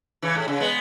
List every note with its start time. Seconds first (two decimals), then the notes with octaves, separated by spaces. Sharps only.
0.22 C#3 E3
0.35 A2
0.48 C#3
0.60 G#3 B3